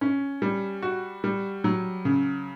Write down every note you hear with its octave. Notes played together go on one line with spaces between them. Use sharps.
C#4
G3
F#4
G3
F#3
C#3